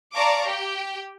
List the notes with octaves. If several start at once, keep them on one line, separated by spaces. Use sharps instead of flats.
D5 F5 A5 A#5 C#6 D6
G4 G5